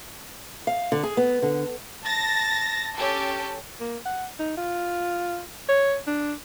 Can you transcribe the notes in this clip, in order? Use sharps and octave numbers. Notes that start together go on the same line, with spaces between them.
F5
D3
G#4
B3
D3
A5 A6 A#6
C#4 G4 A4
A#3
F#5
D#4
F4
C#5
D4